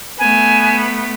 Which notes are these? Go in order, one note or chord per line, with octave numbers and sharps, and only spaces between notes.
A3 B3 G#5